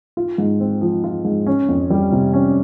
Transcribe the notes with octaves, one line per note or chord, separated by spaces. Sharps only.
F4
G#2
C4
F3
F4
G#2
C#4
F2
G3
C3
C#4